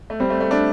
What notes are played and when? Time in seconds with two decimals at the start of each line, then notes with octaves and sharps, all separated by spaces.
0.10 A3
0.20 G3 C4
0.30 A3
0.40 A3
0.51 A3 D4